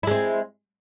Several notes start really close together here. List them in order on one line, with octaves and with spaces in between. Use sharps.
E4 G#3 C4